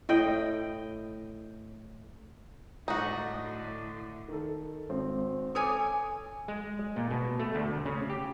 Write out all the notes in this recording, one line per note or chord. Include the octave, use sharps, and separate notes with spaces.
A2 D#5 G5
A2 D3 D#4 F#4
D#3 A4
G#1 C4
A4 C#5 G#5 D6 D#6
G#3
A#2
B2
A3
D2
C#3
G4